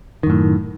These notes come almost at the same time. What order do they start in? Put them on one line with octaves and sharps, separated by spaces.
D#3 F#2 A2